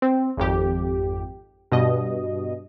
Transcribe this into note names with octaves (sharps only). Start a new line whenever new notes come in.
C4
G#1 F2 G4
G2 B2 D#5